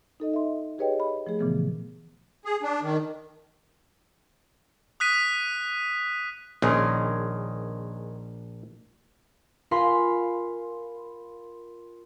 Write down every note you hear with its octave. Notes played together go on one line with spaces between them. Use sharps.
D#4 A4 D#5
E5 C6
G4 G#4 B4 C#5 D#5 G5
B5
F3 A3 G#4
A#2 C#3 E3 F3 B3
G#4
D4
D#3
D#6 F#6 B6 D#7
A#1 D#3 G#3 C#4
F4 A#4 F5 G#5 B5 C6